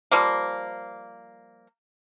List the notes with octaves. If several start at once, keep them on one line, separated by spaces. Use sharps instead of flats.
F3 G3 A#3